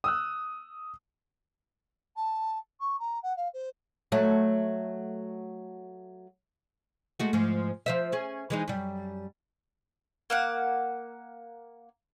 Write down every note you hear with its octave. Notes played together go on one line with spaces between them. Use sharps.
D#6 E6 F#6
A5
C#6
A#5
F#5
F5
C5
F#3 A3
G#3 A3 F#4
G#2 F3
F3 C5 E5
C#4 G#4
E3 G#3 D#4
F#2 G3
A#3 F5 F#5